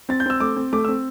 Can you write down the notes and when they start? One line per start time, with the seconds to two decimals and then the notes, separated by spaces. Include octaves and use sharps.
0.09 C4 A6
0.20 G6
0.26 C4 E6
0.40 A3 D6
0.56 C4
0.73 A3 D6
0.85 C4 E6